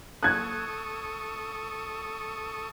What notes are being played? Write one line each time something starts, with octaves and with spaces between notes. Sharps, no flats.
A4 C#6 D#6 F#6 G#6